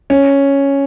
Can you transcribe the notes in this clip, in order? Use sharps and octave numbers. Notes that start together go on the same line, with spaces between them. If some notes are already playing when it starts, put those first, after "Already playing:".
C#4